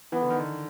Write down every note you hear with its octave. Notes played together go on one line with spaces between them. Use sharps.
E3 B3
D3
D#3
D3